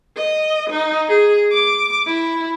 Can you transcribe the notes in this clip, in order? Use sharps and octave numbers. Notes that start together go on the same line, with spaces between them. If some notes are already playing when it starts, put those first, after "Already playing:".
D#5
D#4
G#4
D6
E4